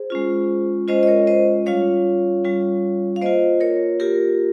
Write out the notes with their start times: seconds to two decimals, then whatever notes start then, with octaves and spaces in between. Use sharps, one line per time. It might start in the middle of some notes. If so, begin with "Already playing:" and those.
Already playing: G#4 C5
0.10 G#3 C#4 F4
0.88 G#3 C#4 F4 C5 D#5
1.03 D#5
1.07 A#4 C#5
1.27 C5 D#5
1.66 G3 C#4 F4 C#5 F5
2.45 G3 C#4 F4
3.16 F5
3.21 A#3 F4 C5 D#5
3.60 A#4 C#5
4.00 A#3 F4 G4 A#4